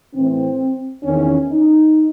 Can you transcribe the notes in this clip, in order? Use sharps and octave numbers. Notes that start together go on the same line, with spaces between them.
A2 E3 C4
E2 D#3 C#4
D#4